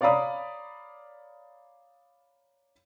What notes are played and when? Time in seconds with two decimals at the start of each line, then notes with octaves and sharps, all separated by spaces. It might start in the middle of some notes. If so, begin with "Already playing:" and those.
0.01 C#5 D5 F5 A#5 B5 D#6